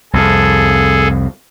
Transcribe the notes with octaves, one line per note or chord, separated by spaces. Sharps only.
C2 F2 G#4 A4